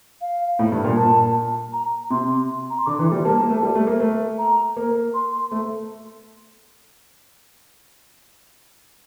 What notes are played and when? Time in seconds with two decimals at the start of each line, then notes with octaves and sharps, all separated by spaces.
0.21 F5
0.59 A2
0.72 G2
0.84 A#2
0.97 A#2 A5
1.73 A#5
2.10 C3 C6
2.70 A#5
2.79 C6
2.86 D3 D6
2.99 E3
3.12 G3
3.25 A#3 A5
3.37 A#3
3.49 A3
3.62 G3
3.75 A3
3.87 A#3
4.00 A3
4.38 A#5
4.76 A#3
5.14 C6
5.51 A3